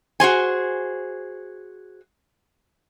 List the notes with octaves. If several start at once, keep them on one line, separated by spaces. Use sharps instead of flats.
F#4 G#4 C5 G#5